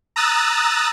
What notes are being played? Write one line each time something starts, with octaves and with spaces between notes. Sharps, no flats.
A#5 D#6 E6 F#6 A6